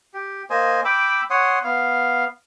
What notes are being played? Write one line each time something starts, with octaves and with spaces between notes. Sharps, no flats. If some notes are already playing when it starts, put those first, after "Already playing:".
G4
A#3 C5 D#5 G#5
G5 B5 D6 E6
C#5 F#5 C6 D#6
B3 F5